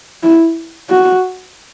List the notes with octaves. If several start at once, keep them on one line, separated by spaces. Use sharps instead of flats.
E4
F#4